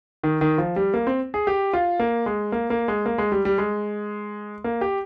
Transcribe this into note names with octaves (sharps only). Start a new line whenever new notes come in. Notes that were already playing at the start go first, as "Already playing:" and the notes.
D#3
D#3
F3
G3
A#3
C4
G#4
G4
F4
A#3
G#3
A#3
A#3
G#3
A#3
G#3
G3
G3
G#3
A#3
G4